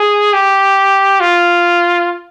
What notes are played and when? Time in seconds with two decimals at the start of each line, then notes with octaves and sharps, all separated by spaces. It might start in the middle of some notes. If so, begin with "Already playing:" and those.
Already playing: G#4
0.34 G4
1.20 F4